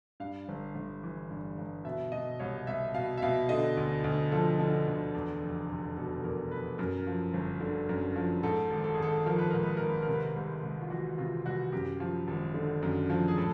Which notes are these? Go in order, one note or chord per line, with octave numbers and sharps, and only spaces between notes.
G2 F5
G1
G1
E3
G2
G1
B2 E5
B2 D#5
C2 C#5
C2 E5
B2 F5
E5
B2 F5
D3 D#5
D2
D2
F3 A4
D3
D2
E2
F1
F1
B2 A4
E2 A#4
F1 B4
F#2 A#4
F3
G1
D3
F#2
F3
G#2 A4
G#1
A4
G#4
G#1 A4
F3 A#4
B4
G#2 A#4
B4
G#1 A#4
B4
A#4
C3
B4
A#4
C2
C2
F4
E3 F#4
C3 F4
C2 F#4
F#2 G4
F3
G#1
D3
F#2
F3
G#4
A2 A4